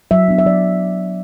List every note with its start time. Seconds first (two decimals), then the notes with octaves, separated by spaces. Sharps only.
0.11 F#3 E5
0.28 B3 D4
0.39 E5
0.46 F#3 D5